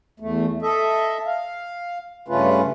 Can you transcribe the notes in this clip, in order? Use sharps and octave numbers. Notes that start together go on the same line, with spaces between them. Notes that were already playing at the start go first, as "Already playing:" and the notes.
E2 A3
A4 D#5 E5
F5
G2 C#3 A3 C#4 F4 B4